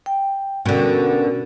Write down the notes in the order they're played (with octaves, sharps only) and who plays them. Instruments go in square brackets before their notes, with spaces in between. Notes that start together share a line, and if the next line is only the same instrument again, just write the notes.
[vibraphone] G5
[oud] B2 D3 [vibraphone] C#4 F#4 A#4